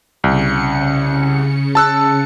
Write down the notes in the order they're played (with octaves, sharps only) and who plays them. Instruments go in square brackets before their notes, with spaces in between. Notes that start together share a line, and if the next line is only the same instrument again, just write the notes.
[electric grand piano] C2 [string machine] C#3 C#7
[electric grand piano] A5 E6 F#6